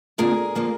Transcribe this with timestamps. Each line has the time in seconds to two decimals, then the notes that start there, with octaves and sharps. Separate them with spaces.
0.18 F2 D3 F3 A#3 G#4 A#4
0.55 D3 F3 A#3